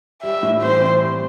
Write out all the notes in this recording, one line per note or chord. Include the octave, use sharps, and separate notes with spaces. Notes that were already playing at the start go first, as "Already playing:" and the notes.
G3 E5
A2
E3 C5
C4
G3